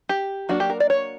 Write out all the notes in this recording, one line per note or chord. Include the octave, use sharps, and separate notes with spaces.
G4
F#3 A#3 D4 F#4
G4
A#4
D5
C#5